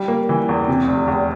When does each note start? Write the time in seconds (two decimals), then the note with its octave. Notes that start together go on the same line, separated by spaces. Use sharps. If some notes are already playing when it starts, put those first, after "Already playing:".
Already playing: G3
0.08 A#3
0.29 E3
0.49 E2
0.68 C3
0.87 F1
1.07 E2